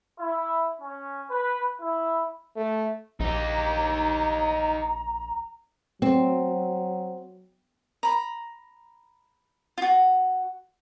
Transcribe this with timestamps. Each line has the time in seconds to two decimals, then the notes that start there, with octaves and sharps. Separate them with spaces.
0.18 E4
0.80 C#4
1.30 B4
1.81 E4
2.56 A3
3.20 A#1 D#4 G4 A#5
6.02 F#3 C4
8.03 A#5 B5
9.78 F4 F#4